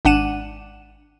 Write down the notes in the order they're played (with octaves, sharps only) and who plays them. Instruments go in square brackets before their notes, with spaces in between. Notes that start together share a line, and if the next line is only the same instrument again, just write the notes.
[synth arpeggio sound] G#1 D4 F#5 D#7 E7